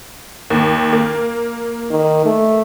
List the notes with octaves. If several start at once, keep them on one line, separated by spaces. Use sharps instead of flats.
D#2
A#3
D#3
A3